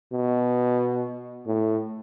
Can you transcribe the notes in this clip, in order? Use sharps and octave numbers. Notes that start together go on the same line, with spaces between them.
B2
A2